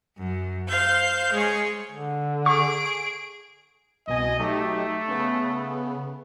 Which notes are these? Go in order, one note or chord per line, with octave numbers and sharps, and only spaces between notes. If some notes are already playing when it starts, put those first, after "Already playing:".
F#2
C5 F5 G6
G#3 G#4 C#5
D3
G#4 C#6 D7
C2 B2 D#5 G#5
F#3 A3 D#4 G4
C#3 B3